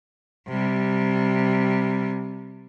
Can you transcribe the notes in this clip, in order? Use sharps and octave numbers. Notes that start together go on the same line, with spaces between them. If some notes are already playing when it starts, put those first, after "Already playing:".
C3 G3